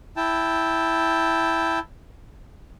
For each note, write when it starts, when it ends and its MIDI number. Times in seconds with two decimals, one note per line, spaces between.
0.16 1.79 64
0.16 1.79 79
0.16 1.79 81